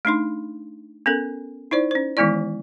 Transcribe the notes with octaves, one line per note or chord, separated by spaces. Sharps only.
A3 D4 D#4 C6
B3 C#4 A4 A#4
D#4 E4 C5 D5
C#4 C5
D#3 E3 G#3 B3 E4 D5